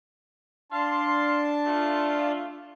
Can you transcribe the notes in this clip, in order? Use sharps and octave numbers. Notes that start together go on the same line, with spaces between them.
D4 F5 A5 C6
A3 F4